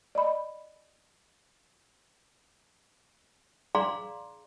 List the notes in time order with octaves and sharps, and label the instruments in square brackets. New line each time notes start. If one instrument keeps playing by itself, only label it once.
[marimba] D5 D#5 B5
[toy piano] G#4 D5 F5 A#5 C6